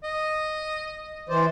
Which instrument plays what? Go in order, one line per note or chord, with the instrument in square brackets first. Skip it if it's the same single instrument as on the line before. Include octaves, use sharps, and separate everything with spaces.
[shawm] D#5
[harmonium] E3 C5 [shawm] D5